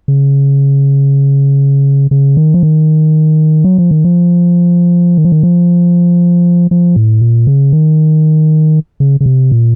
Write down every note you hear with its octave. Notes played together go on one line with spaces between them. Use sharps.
C#3
C#3
D#3
F3
D#3
F#3
F3
D#3
F3
D#3
F3
D#3
F3
F3
A2
A#2
C#3
D#3
C#3
C#3
C3
A#2